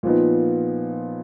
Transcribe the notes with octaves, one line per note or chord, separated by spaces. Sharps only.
A#2 F3 B3 D#4